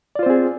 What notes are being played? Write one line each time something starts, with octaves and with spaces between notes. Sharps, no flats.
C4 F4 G#4 C5 D5